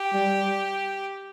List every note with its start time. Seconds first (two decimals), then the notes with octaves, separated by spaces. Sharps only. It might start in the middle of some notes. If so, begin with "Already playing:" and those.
Already playing: G4
0.13 G3